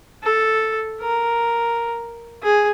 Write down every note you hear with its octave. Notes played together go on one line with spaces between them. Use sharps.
A4
A#4
G#4